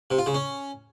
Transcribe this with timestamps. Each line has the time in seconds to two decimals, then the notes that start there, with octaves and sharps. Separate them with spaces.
0.11 C3
0.18 F4
0.26 C#3
0.34 C#4